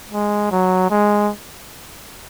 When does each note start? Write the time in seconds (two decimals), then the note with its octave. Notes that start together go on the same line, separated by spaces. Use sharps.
0.12 G#3
0.51 F#3
0.90 G#3